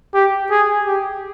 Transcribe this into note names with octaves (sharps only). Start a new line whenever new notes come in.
G4
G#4
G4